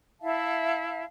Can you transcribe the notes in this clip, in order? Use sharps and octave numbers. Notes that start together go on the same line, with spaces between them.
E4 E5 F5 A5